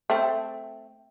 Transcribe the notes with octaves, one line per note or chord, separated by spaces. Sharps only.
A3 C4